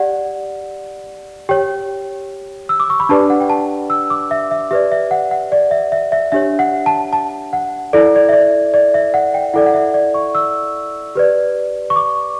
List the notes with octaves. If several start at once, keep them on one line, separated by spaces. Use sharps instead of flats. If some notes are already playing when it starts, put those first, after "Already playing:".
Already playing: G4 D5 F#5
G4 C#5 G5
E6
D6
C#6
B5
D4 G4 B4 D5 A5
F#5
G5
A5
E6
D6
E5
E5
G4 B4 D5 E5
E5
F#5
F#5
D5
E5
E5
E5
D4 G4 C#5 E5
F#5
A5
A5
F#5
E4 A4 D5
D5
E5
D5
D5
E5
F#5
G5
E4 A4 D5 F#5
F#5
E5
D5
C#6
E6
G4 B4 D5
C#6
D6